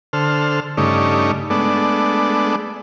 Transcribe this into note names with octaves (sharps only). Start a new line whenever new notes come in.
D3 A4 C5 F6
G2 C#3 A3 D#4 D5 C#6
G#3 A3 B3 D4 D5